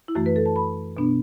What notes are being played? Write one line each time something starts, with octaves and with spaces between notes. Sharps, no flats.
E4
F#2 E3 A3 F#4
B4
A4
A5
B5
B2 B3 D4